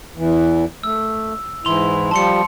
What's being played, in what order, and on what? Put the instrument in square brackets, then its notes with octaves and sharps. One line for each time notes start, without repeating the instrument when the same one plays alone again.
[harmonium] E2 E3
[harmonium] A3 [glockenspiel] E6
[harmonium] G#2 E3 E4 [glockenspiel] C6 F7
[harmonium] F3 G3 [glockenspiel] A5 C6 C#7